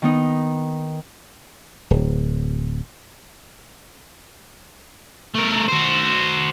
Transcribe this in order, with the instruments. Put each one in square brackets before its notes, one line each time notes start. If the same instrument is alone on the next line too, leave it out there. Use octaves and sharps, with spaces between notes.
[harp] D#3 B3 D#4
[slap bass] D1
[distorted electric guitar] A3 A#4
F#4 C5